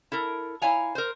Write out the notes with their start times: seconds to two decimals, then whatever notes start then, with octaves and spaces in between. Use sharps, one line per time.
0.12 E4 A4 A#4
0.62 E4 C#5 F5 G#5 A#5
0.95 A#4 C5